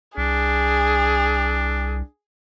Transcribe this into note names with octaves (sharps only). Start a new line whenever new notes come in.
C2 D4 G#4